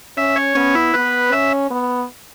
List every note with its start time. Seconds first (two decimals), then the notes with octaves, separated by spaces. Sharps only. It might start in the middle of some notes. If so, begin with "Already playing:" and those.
0.17 C#4 E5
0.36 C#5
0.55 B3 C#4
0.75 E4
0.94 B3 B4
1.32 C#4 E5
1.71 B3